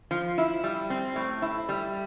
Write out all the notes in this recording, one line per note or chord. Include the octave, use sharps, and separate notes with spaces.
F3
E4
G3
C4
A2
E4
G3